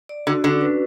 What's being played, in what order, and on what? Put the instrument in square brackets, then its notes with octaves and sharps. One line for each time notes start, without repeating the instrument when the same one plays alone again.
[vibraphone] D5
[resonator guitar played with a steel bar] D3 [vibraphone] F#4
[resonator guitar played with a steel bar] D3 [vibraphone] C#4
[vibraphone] B4